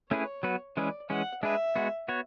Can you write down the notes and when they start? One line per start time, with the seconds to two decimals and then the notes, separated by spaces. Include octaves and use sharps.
0.11 A3 C#4 E4 G#4 B4 C#5
0.43 F#3 B3 F#4 B4
0.77 E3 G#3 C#4 G#4 B4 D5
1.10 E3 G#3 C#4 F#5
1.43 G#3 D4 G#4 B4 E5
1.76 G#3 B3 F#4
2.08 B3 F#4 C#5